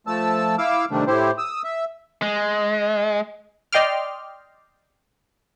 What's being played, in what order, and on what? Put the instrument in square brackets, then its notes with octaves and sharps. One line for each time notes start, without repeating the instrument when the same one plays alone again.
[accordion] F3 A3 A5 E6
E4 F5 D6 E6
C3 D#3 G3 A3 D4
A2 E4 G4 C5
D#6 E6
E5
[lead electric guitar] G#3
[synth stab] D5 D#5 G5 C6 D6 F6